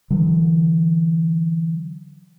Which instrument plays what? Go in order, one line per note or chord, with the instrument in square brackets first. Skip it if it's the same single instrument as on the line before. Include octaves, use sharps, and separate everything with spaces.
[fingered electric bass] D3 E3 F#3